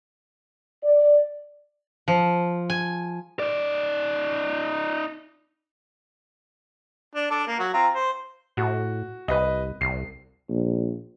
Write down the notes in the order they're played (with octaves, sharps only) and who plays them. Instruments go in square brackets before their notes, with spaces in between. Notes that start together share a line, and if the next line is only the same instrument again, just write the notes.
[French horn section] D5
[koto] F3
G#5
[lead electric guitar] D#4 D5
[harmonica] D4
D4 A4 D5
A#3
F#3 F#4
C4 F4 A#5
C5
[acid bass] A2 [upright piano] F#4
[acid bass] C2 [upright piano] B4 D#5
[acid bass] C2 [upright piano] C7
[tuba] A#1